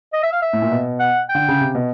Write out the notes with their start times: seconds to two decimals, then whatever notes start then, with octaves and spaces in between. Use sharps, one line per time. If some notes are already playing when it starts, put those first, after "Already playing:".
0.13 D#5
0.23 E5
0.32 F5
0.42 E5
0.53 A2
0.62 A#2
0.71 B2
1.00 F#5
1.29 G5
1.35 D3
1.48 C#3
1.61 C3
1.75 B2